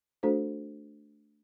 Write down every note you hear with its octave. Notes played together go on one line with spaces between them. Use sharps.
A3 D4 F#4 A4 C5